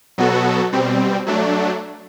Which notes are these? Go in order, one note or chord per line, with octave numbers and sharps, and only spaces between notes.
B2 F#3 B3 F#4 A4
B2 G3 C4
F#3 A3 D4